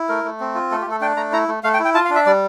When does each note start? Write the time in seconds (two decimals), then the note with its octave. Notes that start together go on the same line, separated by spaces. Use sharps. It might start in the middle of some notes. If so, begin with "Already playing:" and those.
Already playing: E4
0.09 A3 A#4
0.24 A3
0.40 C4
0.55 F4
0.71 A3 A4
0.81 G4
0.87 A3 A4
1.01 D4 G5
1.17 A3 A#5
1.32 E4 A#5
1.48 A3
1.63 A3 F5
1.74 G5
1.79 E4
1.85 G5
1.94 F4 A5
2.05 F5
2.10 D4
2.15 E5
2.26 G3 D5